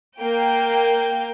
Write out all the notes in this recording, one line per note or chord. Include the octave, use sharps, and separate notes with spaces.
A#3 G5